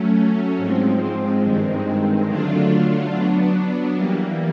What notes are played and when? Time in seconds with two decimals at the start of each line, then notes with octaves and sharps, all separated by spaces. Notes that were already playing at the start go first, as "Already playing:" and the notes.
Already playing: F#3 A3 C#4
0.57 G#2 F3 G#3 C4
1.43 G2 D#3 G#3 C4
2.27 D3 F#3 A3 D4 F4
3.11 F#3 B3 D4
3.95 E3 G3 A#3